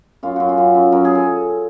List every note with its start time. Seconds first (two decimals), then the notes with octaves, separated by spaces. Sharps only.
0.23 F#2 F4
0.36 F#2 F#4
0.49 F4
0.58 F#2
0.75 F#2
0.92 F#2 A#4
1.05 G#4
1.15 A4